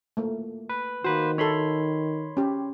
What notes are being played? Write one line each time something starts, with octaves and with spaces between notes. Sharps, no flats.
A3 A#3
B4
D#3 A#3 F#4 B4 C5
D#4 A4 C#5 B5 C6
C#4 G4